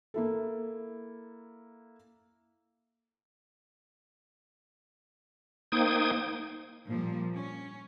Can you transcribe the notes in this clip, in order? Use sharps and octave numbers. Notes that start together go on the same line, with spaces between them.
A#3 E4 A4
A#3 D#4 C5 G5 D#6 G#6
A#2 F3 G3 A#3
C#4